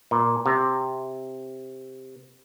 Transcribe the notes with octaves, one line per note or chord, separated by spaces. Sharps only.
A#2
C3